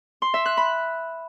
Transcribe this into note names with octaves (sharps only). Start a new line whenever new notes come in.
C6
E5
F#6
B5